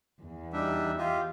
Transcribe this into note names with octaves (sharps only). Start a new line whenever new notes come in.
E2
G3 D4 D#4 E5
F4 G4 D#5 E5